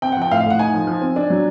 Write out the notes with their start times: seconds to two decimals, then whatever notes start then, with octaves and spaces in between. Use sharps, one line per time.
0.02 C4 G5
0.12 F#5
0.17 F3 G5
0.30 A2 F5
0.41 F5
0.45 A2 F#5
0.59 D#4 G#5
0.74 F3
0.87 F3
1.01 C4
1.16 D4
1.30 F#3